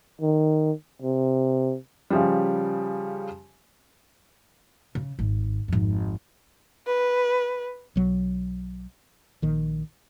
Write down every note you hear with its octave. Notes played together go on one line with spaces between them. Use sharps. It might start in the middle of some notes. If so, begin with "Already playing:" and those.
D#3
C3
C#3 F3 G3
C#3
G#1
G#1 F2
B4
B1 F#3
A#1 D#3